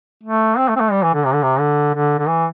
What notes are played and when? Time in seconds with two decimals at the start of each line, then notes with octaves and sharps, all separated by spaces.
0.23 A3
0.58 C4
0.69 A3
0.76 C4
0.80 A3
0.91 G3
1.03 E3
1.14 D3
1.26 C3
1.34 D3
1.43 C3
1.60 D3
1.94 D3
2.19 D3
2.28 E3